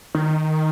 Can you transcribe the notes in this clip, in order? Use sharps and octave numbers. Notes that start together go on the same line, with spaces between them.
D#3